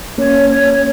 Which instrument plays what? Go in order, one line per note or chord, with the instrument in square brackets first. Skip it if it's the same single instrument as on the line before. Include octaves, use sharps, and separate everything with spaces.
[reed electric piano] A#3 C#4 [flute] C#5
[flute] C#5
C#5